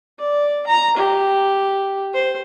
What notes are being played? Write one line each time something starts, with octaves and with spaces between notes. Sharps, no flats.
D5
A#5
G4
C5